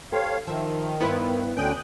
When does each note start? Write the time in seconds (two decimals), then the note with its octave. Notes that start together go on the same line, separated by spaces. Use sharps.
0.12 G4 A4 C5 C#5 F5
0.47 D#3 F3 E5
1.00 G2 B3 E4 B4 C5
1.57 D2 D3 C#4 D4 G5 D#6 F#6 G6